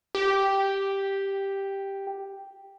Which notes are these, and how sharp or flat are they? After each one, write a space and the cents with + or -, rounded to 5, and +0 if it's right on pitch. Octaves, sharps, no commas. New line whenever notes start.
G4 +0